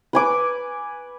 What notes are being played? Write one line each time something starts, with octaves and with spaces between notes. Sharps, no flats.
B4 G#5 D6